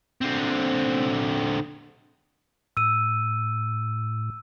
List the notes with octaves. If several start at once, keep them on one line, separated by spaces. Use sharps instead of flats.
D3 C4
A2 E6 D#7